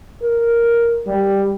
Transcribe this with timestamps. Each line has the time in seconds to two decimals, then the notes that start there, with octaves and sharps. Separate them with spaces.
0.22 A#4
1.06 G3